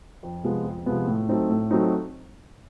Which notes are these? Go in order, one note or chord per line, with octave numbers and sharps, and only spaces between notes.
F2
C3 F3 G#3 B3
F2
C3 F3 G#3 B3
A2
F#3 A3 C4 D#4
A2
F#3 A3 C4 D#4